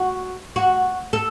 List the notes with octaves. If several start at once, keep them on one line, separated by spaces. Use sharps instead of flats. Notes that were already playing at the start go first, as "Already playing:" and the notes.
Already playing: F#4
F#4
A4